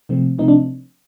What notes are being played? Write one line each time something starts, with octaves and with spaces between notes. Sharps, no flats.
C3 F3 A3 C4
C3 F3 A3 C4 D#4
D4